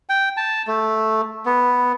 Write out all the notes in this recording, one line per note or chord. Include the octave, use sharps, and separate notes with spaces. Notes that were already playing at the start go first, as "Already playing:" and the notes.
G5
A5
A3
B3